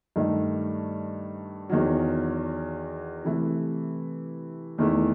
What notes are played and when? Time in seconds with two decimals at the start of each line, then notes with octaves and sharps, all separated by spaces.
0.16 G2 D#3 A3 D#4
1.70 E2 D#3 F#3
3.25 C3 E3 A3
4.78 E2 D#3 A3 E4